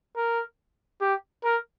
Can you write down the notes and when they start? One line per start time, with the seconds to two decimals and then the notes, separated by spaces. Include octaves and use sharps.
0.16 A#4
1.01 G4
1.44 A#4